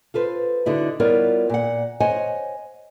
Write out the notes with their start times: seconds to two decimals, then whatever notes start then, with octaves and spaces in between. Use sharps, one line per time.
0.14 F4 A4 B4 C5
0.66 D3 D#4 E4 F#4
1.00 G3 B3 E4 F4 A#4 C#5
1.49 A#2 F#5
2.00 C5 C#5 D#5 F#5 G#5